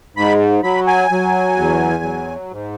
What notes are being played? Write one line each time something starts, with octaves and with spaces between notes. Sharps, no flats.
G#2 B5
F#3 B5
G#5
F#3
E2
F#3
G#2